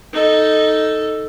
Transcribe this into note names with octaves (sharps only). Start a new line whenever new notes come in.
D#4 A4